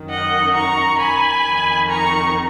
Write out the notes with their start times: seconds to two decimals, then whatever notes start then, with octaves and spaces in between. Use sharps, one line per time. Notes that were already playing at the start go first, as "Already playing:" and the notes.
Already playing: F#2 D#3
0.10 D#5 F#5
0.55 A#5 C#6
1.00 G#5 B5
1.45 F2 D#3
1.89 A#5 C#6